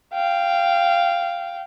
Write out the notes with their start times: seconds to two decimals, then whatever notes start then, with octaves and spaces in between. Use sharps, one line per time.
0.14 F5 G5